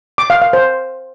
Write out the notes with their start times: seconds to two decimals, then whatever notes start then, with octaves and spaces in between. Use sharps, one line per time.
0.18 D6
0.30 F5
0.42 F5
0.53 C5